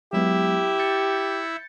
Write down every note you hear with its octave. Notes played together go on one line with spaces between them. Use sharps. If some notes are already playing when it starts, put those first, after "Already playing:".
F#3 G#3 B3 E4 G4 E5
G6 A6 C#7